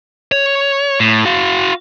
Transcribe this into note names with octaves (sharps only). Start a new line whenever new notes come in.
C#5
A2
F#4 F5